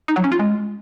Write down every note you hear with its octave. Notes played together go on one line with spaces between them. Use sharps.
D#4
F#3
C#4
F4
G#3